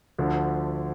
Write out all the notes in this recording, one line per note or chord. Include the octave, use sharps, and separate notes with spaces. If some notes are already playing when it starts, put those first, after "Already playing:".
D2 D3 F3